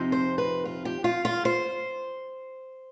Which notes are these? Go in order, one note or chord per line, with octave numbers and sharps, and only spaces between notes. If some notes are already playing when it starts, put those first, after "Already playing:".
Already playing: F2 C3 F3 C4 D#4
C5
B4
F4
G4
F4
F4
C5